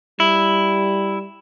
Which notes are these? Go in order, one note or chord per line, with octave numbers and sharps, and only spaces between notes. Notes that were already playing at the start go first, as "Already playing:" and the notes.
G3 E4